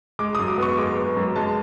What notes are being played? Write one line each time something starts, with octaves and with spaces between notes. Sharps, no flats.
G#3 D6
F#2 D#6
D6
B3 C#6
G#3 D6
B3
F#2
G#3 A5